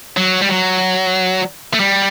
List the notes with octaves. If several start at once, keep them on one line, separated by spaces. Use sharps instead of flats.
F#3
G3
F#3
A3
G3